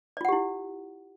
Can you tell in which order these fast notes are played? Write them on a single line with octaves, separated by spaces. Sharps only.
D5 F4 F#5 G4 E4